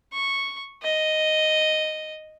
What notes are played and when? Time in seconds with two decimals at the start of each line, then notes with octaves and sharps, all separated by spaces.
0.13 C#6
0.83 D#5